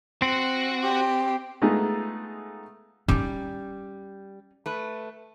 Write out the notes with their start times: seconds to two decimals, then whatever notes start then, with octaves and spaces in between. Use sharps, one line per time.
0.22 C4 F#4 F#5
0.83 G4
1.62 G#3 A3 B3 D#4 F4 G#4
3.08 G3 C#4 D#4
4.66 A3 B4